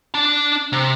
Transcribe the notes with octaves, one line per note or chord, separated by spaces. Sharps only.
D4 A5
C3